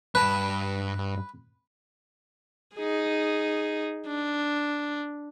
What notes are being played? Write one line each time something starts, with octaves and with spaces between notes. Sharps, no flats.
G2 B4 A5
D#4 G#4
D4